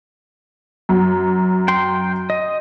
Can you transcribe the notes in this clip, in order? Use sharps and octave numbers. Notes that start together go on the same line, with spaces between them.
F#2
G5 C6
D#5